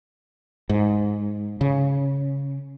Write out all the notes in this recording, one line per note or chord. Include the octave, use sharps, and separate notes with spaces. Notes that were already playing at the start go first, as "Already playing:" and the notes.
G#2
C#3